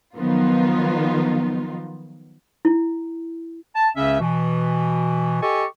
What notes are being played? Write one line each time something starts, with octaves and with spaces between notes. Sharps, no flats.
D#3 F3 F#3 B3 D#4 F4
E4
A5
C#2 C#3 C#4 E5
B2 E3
G4 A4 D#5 G#5 C#6